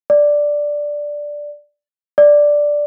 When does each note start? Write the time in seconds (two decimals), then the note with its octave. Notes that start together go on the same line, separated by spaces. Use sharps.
0.10 D5
2.18 D5